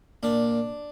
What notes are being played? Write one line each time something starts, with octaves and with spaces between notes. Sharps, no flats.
A#2 D4